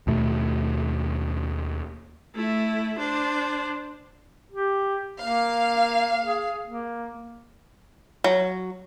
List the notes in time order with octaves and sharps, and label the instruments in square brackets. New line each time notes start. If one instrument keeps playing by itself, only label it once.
[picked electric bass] D#2 B2 A3
[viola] A3 E4
D4 C5
[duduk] G4
[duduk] A#3 [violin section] F5
[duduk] G#4
A#3
[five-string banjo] F#3